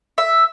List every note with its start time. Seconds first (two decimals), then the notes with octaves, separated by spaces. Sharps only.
0.18 E5